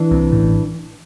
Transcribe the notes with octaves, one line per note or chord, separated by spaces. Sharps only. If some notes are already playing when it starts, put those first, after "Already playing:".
Already playing: E3 D4
C2 C3
A1 A2